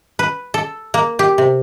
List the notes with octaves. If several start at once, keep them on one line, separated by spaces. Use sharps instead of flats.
B4
A4
A#3
G4
C3